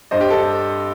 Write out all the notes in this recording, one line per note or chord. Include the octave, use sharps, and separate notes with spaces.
G2 C5 D#5
G4
A4